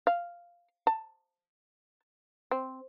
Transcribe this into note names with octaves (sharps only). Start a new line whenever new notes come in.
F5
A5
C4